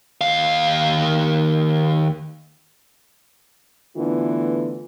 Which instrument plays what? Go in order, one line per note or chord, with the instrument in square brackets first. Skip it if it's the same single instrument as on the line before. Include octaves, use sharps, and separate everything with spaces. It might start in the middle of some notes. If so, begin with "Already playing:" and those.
[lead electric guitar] D#2 F5
[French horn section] D3 E3 A3 B3 F4